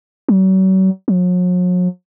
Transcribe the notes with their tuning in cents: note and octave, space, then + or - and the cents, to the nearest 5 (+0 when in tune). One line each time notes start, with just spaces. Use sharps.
F#3 +40
F#3 -45